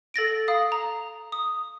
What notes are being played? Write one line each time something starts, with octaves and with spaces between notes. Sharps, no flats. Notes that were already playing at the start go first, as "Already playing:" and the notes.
A4 A6 A#6 D7
F5 D#6
A#5
D#6